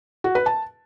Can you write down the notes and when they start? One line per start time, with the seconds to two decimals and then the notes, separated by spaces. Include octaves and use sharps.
0.24 F#4
0.35 B4
0.46 A5